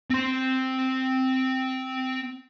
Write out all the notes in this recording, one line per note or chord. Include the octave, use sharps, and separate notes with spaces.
C4 C6